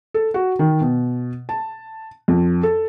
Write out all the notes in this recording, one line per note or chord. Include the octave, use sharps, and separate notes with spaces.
A4
F#4
D#3
B2
A5
F2
A4